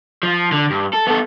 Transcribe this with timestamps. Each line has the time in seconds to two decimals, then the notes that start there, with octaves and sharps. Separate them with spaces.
0.23 F3
0.52 D3
0.70 G2
0.93 A4
1.07 B3 A4